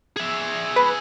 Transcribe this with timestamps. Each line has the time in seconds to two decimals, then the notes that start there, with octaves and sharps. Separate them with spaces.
0.16 G#4 E5
0.76 B4